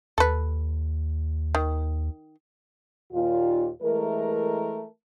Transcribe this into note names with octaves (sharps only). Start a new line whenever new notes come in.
D#2 A4 B4
D#3
D#2 A#2 F4
E3 G#3 A3 A#4